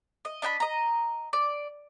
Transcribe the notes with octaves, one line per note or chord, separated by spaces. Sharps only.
D#5
D4 D#5 G5 B5
D#5 A#5
D5